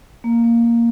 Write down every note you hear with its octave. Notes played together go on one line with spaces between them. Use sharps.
A#3
A#3
A#3